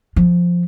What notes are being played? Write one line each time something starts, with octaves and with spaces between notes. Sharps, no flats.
F3